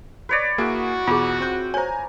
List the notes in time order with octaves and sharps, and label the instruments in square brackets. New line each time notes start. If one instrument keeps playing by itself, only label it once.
[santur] B4 C#5 D5
[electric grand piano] A#3 G#4 [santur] E4 [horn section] F#4
[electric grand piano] E2 B2 [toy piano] F4 G#4
[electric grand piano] C4 G6
[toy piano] C5 C#5 [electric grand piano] G#5 A#5